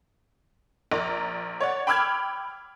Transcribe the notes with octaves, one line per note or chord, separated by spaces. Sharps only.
A#1 A#4 D5 A#5
C#5 D5 F#5
G5 B5 D6 E6 F6 G#6